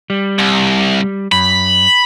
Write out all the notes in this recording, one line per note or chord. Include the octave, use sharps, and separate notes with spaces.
G3
C2
F#2 B5